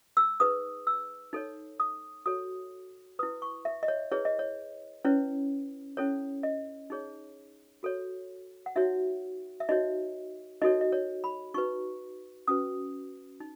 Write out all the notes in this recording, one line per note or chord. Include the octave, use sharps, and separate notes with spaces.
E6
D#4 G#4 B4 D#6
E6
D#4 A4 C#5
D#6
F#4 A4 C#5 D#6
E4 B4 D#6
C#6
E5
D#5
C#5
E4 G#4 B4 C#5
D#5
C#5
C#4 E4 B4 C#5
C#4 E4 A4 C#5
D#5
D#4 G#4 C#5
F#4 A4 C#5
F#5
D#4 F#4 C#5 E5
E5
D#4 F#4 C#5 D#5
D#4 F#4 A4 C#5 D#5
D#5
C#5
B5
D#4 F#4 B4 C#6
C#4 F#4 B4 D#6
D#4